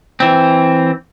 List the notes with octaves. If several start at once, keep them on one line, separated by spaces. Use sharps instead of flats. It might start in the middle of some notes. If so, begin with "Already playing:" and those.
E3 C4